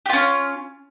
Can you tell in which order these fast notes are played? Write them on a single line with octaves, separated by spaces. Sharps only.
G4 F4 C#4